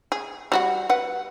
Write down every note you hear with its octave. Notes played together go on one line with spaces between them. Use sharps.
G#4
G3 F#4 F#5
B4 F#5